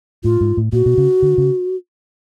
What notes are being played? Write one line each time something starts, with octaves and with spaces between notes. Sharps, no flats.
A2 F4
G#2
A2
A#2 F#4
B2
C#3
D3
C#3